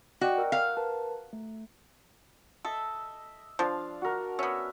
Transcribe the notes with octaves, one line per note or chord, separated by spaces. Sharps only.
F#4 D5 D#5 G5
A#4 E6
F5 F6
A#4 B4 A5
A3
A4 D#5 E5 E6
F3 D4 F5
F#4 A#4
B3 C#4 E5